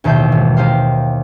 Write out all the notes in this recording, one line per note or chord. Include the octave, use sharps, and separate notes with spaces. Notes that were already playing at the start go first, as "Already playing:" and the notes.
A1 D#2 B2 C5 E5 G6
G#1
D#4 G4 C5 F5